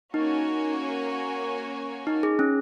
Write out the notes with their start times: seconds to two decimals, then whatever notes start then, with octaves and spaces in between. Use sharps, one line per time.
0.14 A#3 C#4 D#4 F#4 C#5 G#5
2.07 D#4
2.23 G#4
2.39 C#4